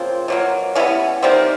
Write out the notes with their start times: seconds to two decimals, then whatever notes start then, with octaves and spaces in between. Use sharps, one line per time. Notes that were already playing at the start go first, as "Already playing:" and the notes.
Already playing: C#3 F3 A#3 C4
0.28 B2 F#3 A#3
0.75 E3 G3 B3 C#4
1.22 D#3 G3 A#3 C4